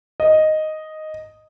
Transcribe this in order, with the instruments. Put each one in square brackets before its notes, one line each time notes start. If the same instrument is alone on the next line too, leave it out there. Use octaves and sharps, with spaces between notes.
[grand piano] D#5